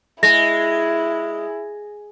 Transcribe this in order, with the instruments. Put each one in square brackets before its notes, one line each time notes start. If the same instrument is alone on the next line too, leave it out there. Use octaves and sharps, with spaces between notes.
[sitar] G#3 [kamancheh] E4 [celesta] A#6